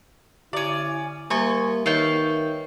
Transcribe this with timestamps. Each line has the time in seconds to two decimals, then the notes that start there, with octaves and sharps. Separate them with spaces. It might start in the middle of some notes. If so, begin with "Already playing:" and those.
0.53 D3 C#4 E4 D5 D#7
1.30 G3 A#3 G4 E5 G#5 C#6
1.86 D#3 B4 C#5 E5 F5 G5 C#6